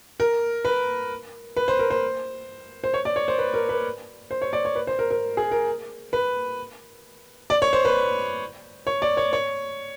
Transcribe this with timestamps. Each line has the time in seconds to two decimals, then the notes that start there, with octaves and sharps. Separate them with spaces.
0.20 A#4
0.65 B4
1.56 B4
1.68 C5
1.79 A#4
1.90 C5
2.84 C5
2.94 C#5
3.05 D5
3.16 C#5
3.28 C5
3.38 B4
3.54 A#4
3.69 B4
4.31 C5
4.41 C#5
4.53 D5
4.65 C#5
4.75 B4
4.87 C5
4.99 A#4
5.10 A#4
5.37 G#4
5.51 A#4
6.13 B4
7.50 D5
7.62 C#5
7.73 C5
7.85 B4
8.87 C#5
9.02 D5
9.17 C#5
9.33 C#5